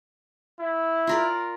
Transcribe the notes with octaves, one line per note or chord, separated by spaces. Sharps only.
E4
F4 A#4 D5